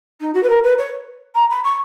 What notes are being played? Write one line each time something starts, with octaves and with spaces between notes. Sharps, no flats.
D#4
F#4
B4
A#4
B4
C#5
A#5
B5
C#6